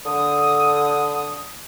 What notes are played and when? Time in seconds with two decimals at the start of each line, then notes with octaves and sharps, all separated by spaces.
0.06 D3 D#6